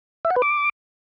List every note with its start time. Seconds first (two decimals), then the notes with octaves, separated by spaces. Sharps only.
0.25 E5
0.30 F#5
0.36 B4
0.42 D6